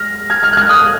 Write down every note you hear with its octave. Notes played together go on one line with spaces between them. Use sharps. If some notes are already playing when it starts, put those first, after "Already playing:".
Already playing: F6 A#6
F6 G#6
F6 G#6
F#6
F6 G#6
D#6 F#6